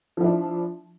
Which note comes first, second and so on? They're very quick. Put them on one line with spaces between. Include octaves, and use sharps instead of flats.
F3 E4 D4